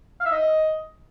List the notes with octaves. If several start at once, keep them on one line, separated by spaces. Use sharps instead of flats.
F5
E5
D#5